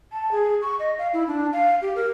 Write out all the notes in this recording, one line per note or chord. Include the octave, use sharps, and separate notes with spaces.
A5
G#4
C#6
D#5
F5
E4
D4
F5
G4
A#4